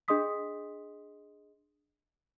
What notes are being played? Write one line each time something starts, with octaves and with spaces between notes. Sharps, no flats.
D4 G#4 D#5 C6 D#6 B6